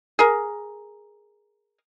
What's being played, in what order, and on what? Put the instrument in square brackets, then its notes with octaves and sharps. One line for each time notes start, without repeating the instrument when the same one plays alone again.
[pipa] G#4 A#4